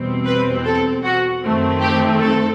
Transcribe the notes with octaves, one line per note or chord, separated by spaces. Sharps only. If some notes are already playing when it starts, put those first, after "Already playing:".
Already playing: E2 B2 G3 C4
B4
A4
F#4
F#2 D#3 A3 C4
G4
A4